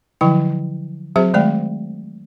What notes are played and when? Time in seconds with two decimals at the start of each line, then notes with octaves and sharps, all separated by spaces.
0.21 D3 F3 F#3 E4 G5
1.16 F#3 C4 F#4 G#4 C5 E5
1.34 D#3 G#3 A3 D5 G5